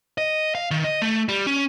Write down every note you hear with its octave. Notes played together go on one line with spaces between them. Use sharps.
D#5
F5
D#3
D#5
A3
G3
C#4